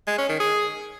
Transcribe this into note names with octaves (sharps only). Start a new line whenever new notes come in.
G#3
C#4
D#3
G#4